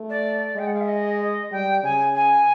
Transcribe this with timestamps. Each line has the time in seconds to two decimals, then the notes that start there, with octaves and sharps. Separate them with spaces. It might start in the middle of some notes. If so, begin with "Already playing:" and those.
Already playing: A3
0.09 D5
0.56 G#3 G5
0.66 F#5
0.73 F5
0.80 E5
0.88 D#5
1.20 D#5
1.51 G3 G5
1.83 C#3 G#5
2.14 G#5